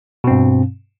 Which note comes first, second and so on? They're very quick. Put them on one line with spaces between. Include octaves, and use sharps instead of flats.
B2 C4 G2